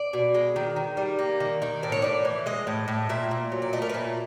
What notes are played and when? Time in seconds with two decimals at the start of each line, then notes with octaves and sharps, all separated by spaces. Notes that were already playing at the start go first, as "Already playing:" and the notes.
Already playing: D5
0.13 B2
0.34 G#3
0.56 D#3
0.76 D#3
0.97 G3
1.19 A#3
1.40 D#3
1.62 D#3
1.83 A2 D5
1.92 C#5
2.02 A2 D5
2.25 E3
2.46 G#3 D#5
2.67 A2
2.88 A2
3.09 A#2 E5
3.31 A#2
3.52 F#3
3.62 D5
3.73 A3 D#5
3.82 A#4
3.89 B4
3.94 A#2